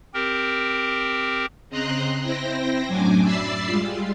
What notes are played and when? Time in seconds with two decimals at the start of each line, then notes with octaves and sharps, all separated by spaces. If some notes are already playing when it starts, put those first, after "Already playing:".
0.14 C4 G4 A#4
1.69 C#3 C4 D#5 A#5 C6 F#6
2.23 C4 E4 C5 G5 A#6
2.88 F#2 A2 F#3 D4 G#5 D6
3.24 D5 E5 B5 E6 A6 C7
3.67 G3 G#3 F4